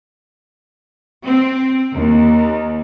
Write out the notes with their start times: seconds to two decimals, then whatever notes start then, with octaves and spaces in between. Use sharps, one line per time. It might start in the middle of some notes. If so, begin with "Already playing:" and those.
1.24 C4
1.93 D#2